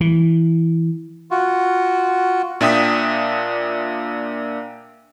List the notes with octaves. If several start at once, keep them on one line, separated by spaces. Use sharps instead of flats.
E3
F4 F#4
A#2 D4 E5 G5 D#6 B6